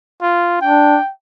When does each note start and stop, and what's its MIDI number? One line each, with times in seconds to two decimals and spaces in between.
0.22 0.57 65
0.61 0.96 62
0.61 1.11 79